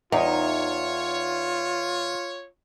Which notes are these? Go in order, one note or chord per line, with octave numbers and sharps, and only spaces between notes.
E2 D#4 F4 C#5